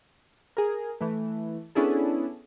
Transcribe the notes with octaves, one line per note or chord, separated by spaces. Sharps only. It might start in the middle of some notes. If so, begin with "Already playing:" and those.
G#4 A#4
E3 A3
B3 C#4 D4 E4 G#4 A4